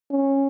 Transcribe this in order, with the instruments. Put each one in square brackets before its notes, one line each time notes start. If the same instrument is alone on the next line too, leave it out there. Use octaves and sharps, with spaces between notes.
[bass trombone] C#4